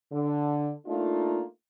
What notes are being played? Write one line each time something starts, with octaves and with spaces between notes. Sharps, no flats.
D3
A3 A#3 D4 D#4 F4